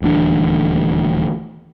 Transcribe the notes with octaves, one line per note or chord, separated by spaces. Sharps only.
D#1 D2 E3 D4